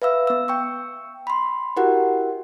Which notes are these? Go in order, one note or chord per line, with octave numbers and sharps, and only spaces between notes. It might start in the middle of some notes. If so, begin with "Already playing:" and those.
B4 E5 F5 E6
B3 E6
G5 C#6 E6
B5 C6
E4 F#4 G4 A#4 F#5